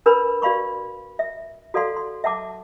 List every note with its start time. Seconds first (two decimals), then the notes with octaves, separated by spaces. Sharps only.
0.06 D4 A#4 B4 G#5 B5
0.42 F#4 D5 F5 B5 C#6
1.19 E5
1.74 F#4 A4 D5 F5 F#5 C6
1.97 C6
2.24 E5 F#5 A5 D6